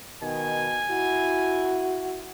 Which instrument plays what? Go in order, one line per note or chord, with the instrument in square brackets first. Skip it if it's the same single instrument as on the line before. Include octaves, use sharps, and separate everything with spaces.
[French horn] B2 [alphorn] D#3 [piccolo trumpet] G#5
[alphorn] E4 [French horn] F#4